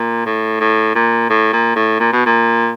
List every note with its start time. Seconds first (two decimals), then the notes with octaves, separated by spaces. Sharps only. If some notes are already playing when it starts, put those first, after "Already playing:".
Already playing: A#2
0.26 A2
0.60 A2
0.95 A#2
1.30 A2
1.53 A#2
1.76 A2
1.99 A#2
2.13 B2
2.26 A#2